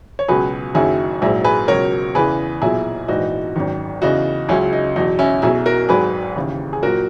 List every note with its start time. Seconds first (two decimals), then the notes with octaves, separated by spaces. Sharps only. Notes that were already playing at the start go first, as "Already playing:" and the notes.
0.19 C#5
0.28 C#2 B2 F#3 G#4 B4
0.74 F#1 F#2 D#3 F#3 E4 G#4
1.21 A#1 G#2 F#3 E4 G#4
1.44 G#4 B4
1.68 C#2 B2 F#3 A#4 C#5
2.15 E2 C#3 E3 G#4 B4
2.62 B1 A#2 F#3 E4 G#4
3.08 A#1 G#2 E3 D#4 F#4
3.56 G#1 F#2 D#3
4.02 E2 C#3 E3 D#4 F#4
4.49 C#2 C#3 F#3 C#4 E4
4.73 D#4
4.96 E2 B2 F#3 D#4
5.19 C#4 E4
5.42 B1 B2 F#3 E4 G#4
5.66 F#4 A#4
5.89 G#1 G#2 F#3 G#4 B4
6.36 D#2 C#3 E3
6.73 G#4
6.82 A#1 A#2 F#3 F#4 A#4